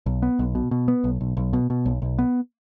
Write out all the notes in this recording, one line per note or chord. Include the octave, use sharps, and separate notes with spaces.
B1
B3
B1
B2
B2
B3
B1
B1
B1
B2
B2
B1
B1
B3